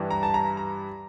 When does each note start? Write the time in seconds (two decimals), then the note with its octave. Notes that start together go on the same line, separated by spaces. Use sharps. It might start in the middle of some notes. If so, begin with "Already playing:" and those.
Already playing: G2 E3 G3
0.11 A#5
0.23 A5
0.34 A#5
0.57 A#5